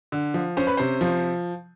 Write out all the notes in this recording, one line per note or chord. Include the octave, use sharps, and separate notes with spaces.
D3
F3
C#4 C5
B4
C3 C5
F3